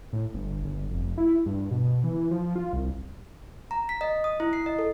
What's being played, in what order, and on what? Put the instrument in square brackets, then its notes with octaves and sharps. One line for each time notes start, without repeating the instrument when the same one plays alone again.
[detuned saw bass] A2
G1
G1
F1
E4
G2
B2
E3
F3
F4
C2
[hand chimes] A#5
B6
D#5
D#6
E4
C7
D#5
A4